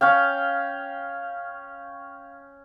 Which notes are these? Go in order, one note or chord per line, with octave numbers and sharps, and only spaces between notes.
C#4 F5 G5